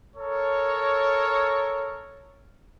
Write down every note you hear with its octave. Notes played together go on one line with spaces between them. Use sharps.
A4 A#4 C#5